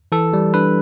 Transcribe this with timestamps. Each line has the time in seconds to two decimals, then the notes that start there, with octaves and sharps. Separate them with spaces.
0.12 E3 A4
0.33 G3
0.54 D4 B4